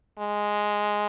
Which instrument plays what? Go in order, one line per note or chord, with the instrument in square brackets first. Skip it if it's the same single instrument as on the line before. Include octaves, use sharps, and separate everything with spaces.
[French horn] G#3